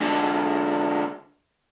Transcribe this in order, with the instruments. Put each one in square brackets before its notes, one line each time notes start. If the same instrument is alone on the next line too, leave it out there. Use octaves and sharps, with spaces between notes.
[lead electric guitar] G#2 D3